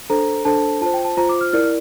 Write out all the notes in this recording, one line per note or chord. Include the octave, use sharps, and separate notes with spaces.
D4 A4 C5 A#5
D4 A4 C5 A5
F4 C5 A5
G5
A5
F4 C5 A#5
D6
F6
E4 A#4 D5 F6